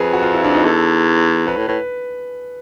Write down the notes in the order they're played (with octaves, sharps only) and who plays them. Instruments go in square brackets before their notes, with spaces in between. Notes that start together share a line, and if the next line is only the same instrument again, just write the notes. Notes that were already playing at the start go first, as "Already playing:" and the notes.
Already playing: [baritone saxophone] F2 [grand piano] G#4 B4
[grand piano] F#4
F4
E4
D4
D#4
[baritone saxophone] E2 [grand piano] A4
[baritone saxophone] F2 [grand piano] B4
[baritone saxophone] A2
[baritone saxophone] A2 [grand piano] B4